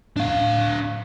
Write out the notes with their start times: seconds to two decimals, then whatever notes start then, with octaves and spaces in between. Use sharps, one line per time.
0.17 D4 F5